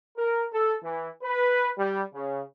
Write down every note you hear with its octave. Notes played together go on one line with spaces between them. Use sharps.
A#4
A4
E3
B4
G3
C#3